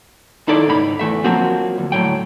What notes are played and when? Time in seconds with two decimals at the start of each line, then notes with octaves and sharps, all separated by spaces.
0.47 D#2 D#4 E4 A4 D5
0.67 C#2 G#2 D#4 B5
0.99 E2 E3 A3 E5
1.24 F3 F#3 A#3 C4 F#4
1.78 D2
1.92 D2 A2 F#3 G5